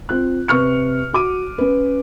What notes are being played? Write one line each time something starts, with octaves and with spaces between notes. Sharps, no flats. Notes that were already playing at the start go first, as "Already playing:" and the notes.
C4 F4 F#6
C3 B4 C#6 F6 C#7
F#4 D6 D#7
C#4 B4